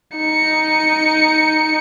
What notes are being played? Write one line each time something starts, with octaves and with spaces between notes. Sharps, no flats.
D#4 C#7